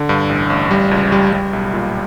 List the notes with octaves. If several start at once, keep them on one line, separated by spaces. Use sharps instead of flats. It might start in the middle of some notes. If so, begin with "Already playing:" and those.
Already playing: D3
G2
A1
A1
G3
C#2
G3
G3
B1
A#2